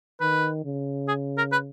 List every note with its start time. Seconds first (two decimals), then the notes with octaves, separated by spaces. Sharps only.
0.21 D#3 B4
0.65 C#3
1.08 G#4
1.38 A#4
1.52 B4